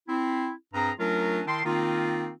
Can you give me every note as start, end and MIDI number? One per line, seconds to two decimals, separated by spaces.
0.08 0.51 60
0.08 0.51 64
0.74 0.91 43
0.74 0.91 60
0.74 0.91 68
0.74 0.91 82
0.98 1.41 54
0.98 1.41 57
0.98 1.41 61
0.98 1.41 62
0.98 1.41 65
0.98 1.41 70
1.47 1.61 51
1.47 1.61 64
1.47 1.61 79
1.47 1.61 81
1.47 1.61 84
1.65 2.32 51
1.65 2.32 58
1.65 2.32 60
1.65 2.32 63
1.65 2.32 65